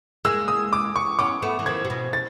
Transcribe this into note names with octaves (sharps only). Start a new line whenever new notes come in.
G#3 A#3 E6
D#6
D6
C#6
B3 C#4 D6
A3 B3
E3
D#3 F3 G#6
C3
B2
A6